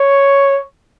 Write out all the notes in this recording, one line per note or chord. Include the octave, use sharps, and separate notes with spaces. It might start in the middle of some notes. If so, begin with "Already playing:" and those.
Already playing: C#5